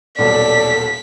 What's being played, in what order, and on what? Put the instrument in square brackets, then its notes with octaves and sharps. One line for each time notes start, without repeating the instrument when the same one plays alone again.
[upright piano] D#1 B1 [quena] A4 [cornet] D5 [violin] B6